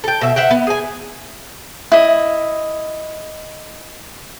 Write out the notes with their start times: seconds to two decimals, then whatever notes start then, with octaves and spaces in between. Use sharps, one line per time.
0.04 A4 G5
0.21 B2 E5
0.36 C5 E5 F#5 G5
0.51 B3
0.67 G#4 G#5
1.92 E4 D#5